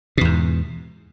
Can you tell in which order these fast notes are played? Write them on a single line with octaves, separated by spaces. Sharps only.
B2 E2 G#2